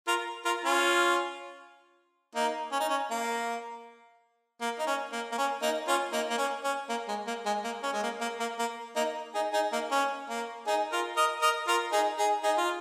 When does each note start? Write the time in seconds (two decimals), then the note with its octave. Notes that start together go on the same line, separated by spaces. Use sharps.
0.08 F4 A#4
0.45 F4 A#4
0.65 C#4 F4
2.35 A#3 D#4
2.72 C#4
2.80 D#4
2.89 C#4
3.11 A#3
4.61 A#3
4.79 D#4
4.87 C#4
5.13 A#3
5.32 A#3
5.38 C#4
5.62 A#3 D#4
5.88 C#4 F4
6.12 A#3 D#4
6.30 A#3
6.38 C#4
6.64 C#4
6.89 A#3
7.08 G#3
7.27 A#3
7.46 G#3
7.64 A#3
7.83 C#4
7.93 G#3
8.03 A#3
8.21 A#3
8.40 A#3
8.59 A#3
8.96 A#3 D#4
9.34 D#4 G#4
9.53 D#4 G#4
9.72 A#3 D#4
9.91 C#4
10.30 A#3
10.67 D#4 G#4
10.92 F4 A#4
11.17 A#4 D#5
11.42 A#4 D#5
11.67 F4 A#4
11.92 D#4 G#4
12.18 D#4 G#4
12.43 D#4 G#4
12.58 F4